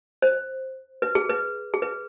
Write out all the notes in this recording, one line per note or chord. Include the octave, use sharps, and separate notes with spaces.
C5
B4
G#4
B4
G#4
B4